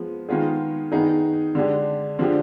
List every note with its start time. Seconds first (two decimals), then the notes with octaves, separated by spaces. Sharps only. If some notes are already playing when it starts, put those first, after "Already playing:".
Already playing: F3 G#3 B3
0.29 D#3 G#3 B3 F4 G#4
0.92 D#3 B3 D#4 G#4
1.55 D3 G#3 D4 G4
2.19 D3 F3 G#3 D4 G4